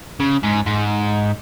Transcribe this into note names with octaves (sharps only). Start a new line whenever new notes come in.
C#3
G#2
G#2